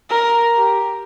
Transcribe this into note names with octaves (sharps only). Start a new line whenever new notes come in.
A#4
G4